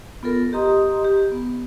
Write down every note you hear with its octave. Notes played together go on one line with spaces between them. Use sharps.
B3 F4 A4 A#4
G4 D#5 A#5 C6 D#6
G4
B3